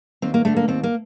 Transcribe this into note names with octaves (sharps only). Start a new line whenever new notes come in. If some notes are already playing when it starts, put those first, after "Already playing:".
D#2 C4
A#3
D3 A3
A#3
D#2 C4
A#3